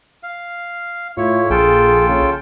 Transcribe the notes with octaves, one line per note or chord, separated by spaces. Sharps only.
F5
A2 E4 F4 C#5
A#1 F4 G#4 A4 G5
C#3